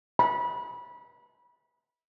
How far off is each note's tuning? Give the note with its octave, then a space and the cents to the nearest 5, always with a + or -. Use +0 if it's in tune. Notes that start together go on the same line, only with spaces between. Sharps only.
B5 -30